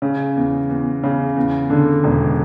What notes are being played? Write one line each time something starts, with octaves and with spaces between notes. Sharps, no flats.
C#3
E2
E2
C#3
E2
D3
E1